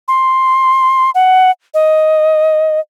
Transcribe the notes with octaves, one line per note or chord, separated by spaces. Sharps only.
C6
F#5
D#5